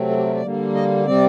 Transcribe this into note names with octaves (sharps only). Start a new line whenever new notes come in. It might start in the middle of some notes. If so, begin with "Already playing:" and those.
Already playing: C3 F#3 A3 C4
A4
G4
A#4
D5
D3 G3 A#3
D#5
C3 G3 C4 D5